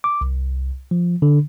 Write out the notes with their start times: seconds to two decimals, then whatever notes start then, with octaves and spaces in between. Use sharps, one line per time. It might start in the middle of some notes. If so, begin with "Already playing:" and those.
0.04 D6
0.21 C2
0.91 F3
1.22 D3